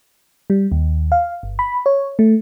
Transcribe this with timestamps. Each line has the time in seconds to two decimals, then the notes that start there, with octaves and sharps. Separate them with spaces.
0.50 G3
0.72 D#2
1.12 F5
1.43 G1
1.59 B5
1.86 C#5
2.19 A3